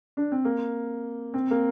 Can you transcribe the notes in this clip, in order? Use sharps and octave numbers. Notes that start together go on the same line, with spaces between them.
D4
C4
A#3
C4
A#3